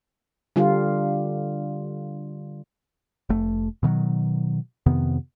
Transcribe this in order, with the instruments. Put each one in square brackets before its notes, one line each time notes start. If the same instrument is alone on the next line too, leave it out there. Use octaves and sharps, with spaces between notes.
[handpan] D3 G3 F4
[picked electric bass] F1 A3
B2 D#3 F3 F#3
F2 C3 D#3 B3